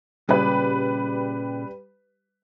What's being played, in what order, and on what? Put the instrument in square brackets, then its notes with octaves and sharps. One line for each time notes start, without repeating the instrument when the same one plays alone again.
[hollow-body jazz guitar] A#2 C#3 [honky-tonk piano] G3 G4 B4